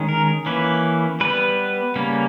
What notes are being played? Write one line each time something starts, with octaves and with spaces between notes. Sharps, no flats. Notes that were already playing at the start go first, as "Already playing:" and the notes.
Already playing: D#3 G#3 C#4
A#4
E3 A#3 C#4 B4
G3 B3 B4
C#3 G3 A#3 C#4